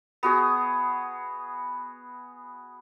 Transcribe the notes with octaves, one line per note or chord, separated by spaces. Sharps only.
B3 F#4 G#4